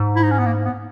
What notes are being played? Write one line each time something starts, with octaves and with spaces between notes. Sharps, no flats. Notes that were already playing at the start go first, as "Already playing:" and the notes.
Already playing: G#2
E4
D#4
C#4
B3
A#3
B3